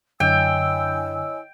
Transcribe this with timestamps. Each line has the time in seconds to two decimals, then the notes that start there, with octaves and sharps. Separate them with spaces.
0.20 F#2 D3 E4 C#5 D#5 G5 G#5 E6